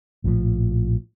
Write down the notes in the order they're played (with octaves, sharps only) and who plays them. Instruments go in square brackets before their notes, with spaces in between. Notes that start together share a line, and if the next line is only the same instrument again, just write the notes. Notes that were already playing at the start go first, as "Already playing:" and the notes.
[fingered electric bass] A#1 A2 C#3 F3